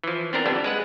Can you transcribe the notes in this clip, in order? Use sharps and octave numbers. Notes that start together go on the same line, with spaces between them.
E3 F3
B3 C4 D4 A#4
F2 D3 G3 B3
G#3 B4 F#5